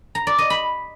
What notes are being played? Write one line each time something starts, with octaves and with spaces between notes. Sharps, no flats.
A#5
D5
D#5
B5